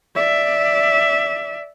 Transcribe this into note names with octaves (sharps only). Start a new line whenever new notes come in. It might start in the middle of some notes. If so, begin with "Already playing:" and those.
D5 E5